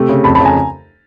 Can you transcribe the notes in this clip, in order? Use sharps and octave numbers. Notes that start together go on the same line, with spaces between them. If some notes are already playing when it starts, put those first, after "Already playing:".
Already playing: C3 A3
C#3
F2 A5 B5
A5 B5
C#3 G#5 A#5